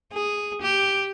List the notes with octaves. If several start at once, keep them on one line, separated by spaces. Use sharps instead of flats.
G#4
G4